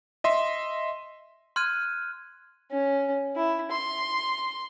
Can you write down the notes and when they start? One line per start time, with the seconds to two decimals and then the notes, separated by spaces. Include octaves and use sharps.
0.24 D#5 E5 C6
1.56 C6 F6 F#6 G#6 D#7
2.71 C#4
3.36 E4
3.71 C6